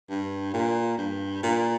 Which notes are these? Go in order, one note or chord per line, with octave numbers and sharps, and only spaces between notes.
G2
A#2
G2
A#2